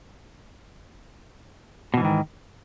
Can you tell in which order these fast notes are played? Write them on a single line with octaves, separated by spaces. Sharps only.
B2 E3 G#2 D#3